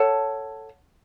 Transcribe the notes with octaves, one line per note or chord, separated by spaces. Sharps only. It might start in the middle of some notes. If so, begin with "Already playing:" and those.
Already playing: A4 C#5 F#5 A5